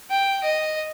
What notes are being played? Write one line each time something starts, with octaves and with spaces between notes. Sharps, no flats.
G5
D#5